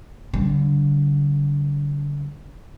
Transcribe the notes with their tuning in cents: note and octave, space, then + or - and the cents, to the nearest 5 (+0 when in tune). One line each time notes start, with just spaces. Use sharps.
D3 -30 G3 -40